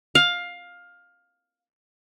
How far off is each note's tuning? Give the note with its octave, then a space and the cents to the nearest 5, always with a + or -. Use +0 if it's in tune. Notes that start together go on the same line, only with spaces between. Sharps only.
F5 +15